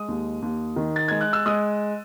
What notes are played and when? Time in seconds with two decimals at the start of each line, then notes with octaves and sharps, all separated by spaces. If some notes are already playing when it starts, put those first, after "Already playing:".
Already playing: G#3 D#6
0.08 D#2
0.42 D#2
0.76 D#3
0.96 A6
1.08 G#3 G#6
1.21 F#6
1.33 E6
1.46 G#3 D#6